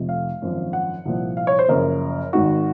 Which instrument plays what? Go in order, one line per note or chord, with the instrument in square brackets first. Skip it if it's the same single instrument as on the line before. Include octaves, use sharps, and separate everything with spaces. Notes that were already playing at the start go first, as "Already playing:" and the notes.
Already playing: [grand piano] F1 F2 C3 F3
F5
G#1 F#2 F3
F#5
C2 A#2 F3
F5
C#5
C5
F#1 F#2 F3 A#4
G#1 G#2 D#3 F#4